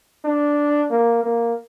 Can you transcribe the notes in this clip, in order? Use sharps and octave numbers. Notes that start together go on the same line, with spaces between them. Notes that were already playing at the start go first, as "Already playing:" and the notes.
D4
A#3
A#3